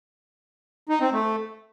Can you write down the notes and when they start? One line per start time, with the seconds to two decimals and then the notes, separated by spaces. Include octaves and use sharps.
0.89 D#4
1.01 C4
1.12 A3